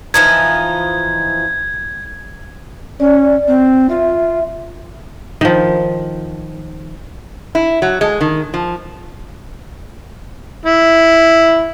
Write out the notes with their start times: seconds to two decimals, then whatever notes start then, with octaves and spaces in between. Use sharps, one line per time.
0.14 E3 F3 D#4 G#6
3.00 C#4 D5
3.48 C4
3.90 F4 E5
5.41 D#3 F3
7.55 E4
7.82 F#3
8.01 G#3
8.21 D#3
8.54 F3
10.66 E4